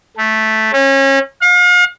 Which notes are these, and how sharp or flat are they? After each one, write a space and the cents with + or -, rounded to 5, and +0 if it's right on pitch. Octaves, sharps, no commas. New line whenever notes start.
A3 -5
C#4 -30
F5 +40